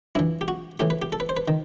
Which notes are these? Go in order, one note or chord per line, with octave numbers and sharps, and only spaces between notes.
G2 E3 E4
G4
F#4
A2 E3 G4
B4
G4
A4
B4
C5
B4
D#3